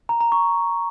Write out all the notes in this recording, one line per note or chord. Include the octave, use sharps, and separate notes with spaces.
A#5
A#5
C#6